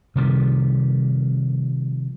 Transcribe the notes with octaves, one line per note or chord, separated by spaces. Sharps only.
C3 D#3 F3 G3